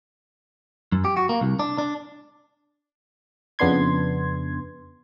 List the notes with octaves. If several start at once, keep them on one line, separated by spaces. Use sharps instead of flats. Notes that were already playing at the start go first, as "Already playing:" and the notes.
F#2
G4
F#4
A#3
C2
D4
D4
F2 C#3 B3 D4 C6 G#6